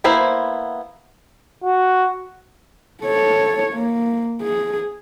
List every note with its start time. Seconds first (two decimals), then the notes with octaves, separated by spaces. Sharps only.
0.04 A#3 B3 E4 C5
1.64 F#4
3.03 A4 C#5
3.74 A#3
4.42 G#4